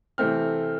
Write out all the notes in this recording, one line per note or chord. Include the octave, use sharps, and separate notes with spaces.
C3 E3 A3 C4 F6